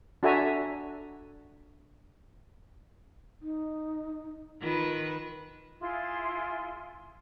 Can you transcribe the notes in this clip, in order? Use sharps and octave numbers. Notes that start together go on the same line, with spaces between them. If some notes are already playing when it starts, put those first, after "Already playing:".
D4 F#4 A4 E5 G#5 A#5
D#4
D#3 F4 B4
E4 F4 G#4 C6